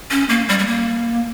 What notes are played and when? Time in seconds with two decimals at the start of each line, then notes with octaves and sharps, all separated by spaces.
0.11 C#4
0.29 A#3
0.48 G3
0.59 G3
0.67 A#3